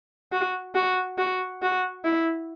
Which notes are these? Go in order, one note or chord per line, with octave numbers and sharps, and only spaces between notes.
F#4
F#4
F#4
F#4
E4